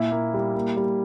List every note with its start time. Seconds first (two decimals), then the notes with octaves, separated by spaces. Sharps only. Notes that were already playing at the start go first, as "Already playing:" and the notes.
Already playing: A#2 E4
0.11 A#3
0.34 G3
0.55 A#3
0.77 G3